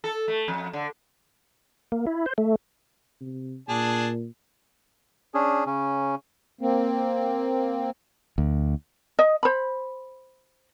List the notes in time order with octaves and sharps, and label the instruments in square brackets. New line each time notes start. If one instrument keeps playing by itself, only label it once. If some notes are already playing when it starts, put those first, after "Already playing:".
[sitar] A4
A3
F2
D3
[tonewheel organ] A#3
E4
C5
A3
[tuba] C3
[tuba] A#2 [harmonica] D4 G#4 A5
[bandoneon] C#4 D4 G#4
C#3 C#4
[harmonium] A#3 C4
[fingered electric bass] D2
[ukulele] D#5
C5 B5